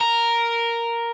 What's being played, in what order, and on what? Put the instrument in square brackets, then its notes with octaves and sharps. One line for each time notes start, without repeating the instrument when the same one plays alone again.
[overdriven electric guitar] A#4